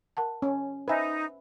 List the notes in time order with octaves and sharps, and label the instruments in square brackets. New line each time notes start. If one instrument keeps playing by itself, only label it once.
[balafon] A#4 F#5 A5
[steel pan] C#4
[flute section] D#4 [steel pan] B4 E5 [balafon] C5 G#5